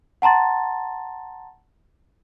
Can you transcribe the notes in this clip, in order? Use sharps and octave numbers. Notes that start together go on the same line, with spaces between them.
F#5 A5 A#5 C6 A6